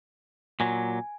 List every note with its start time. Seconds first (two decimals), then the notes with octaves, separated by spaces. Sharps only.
0.60 A#2 F#3 G#5